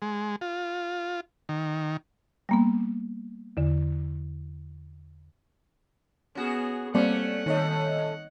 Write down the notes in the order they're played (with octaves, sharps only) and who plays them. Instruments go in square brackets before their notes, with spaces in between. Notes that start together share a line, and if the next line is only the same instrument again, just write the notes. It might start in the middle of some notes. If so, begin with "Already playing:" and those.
[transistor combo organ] G#3
F4
D#3
[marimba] G3 A#3 B3
E2 D3
[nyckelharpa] B3 G#4 [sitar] C#4 F#4
[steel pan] G3 A#3 C4 [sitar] A3 C#4 [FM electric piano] D5 [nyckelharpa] F#5
[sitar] A#2 A3 [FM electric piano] D#3 C#5 D#5